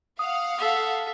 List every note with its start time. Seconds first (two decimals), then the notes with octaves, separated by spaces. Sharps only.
0.19 F5 F#5 D#6
0.58 A4 E5